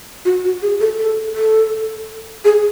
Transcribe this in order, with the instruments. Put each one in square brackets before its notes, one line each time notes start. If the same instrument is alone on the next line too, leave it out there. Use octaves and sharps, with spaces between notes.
[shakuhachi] F#4
F#4
G#4
A4
A4
A4
G#4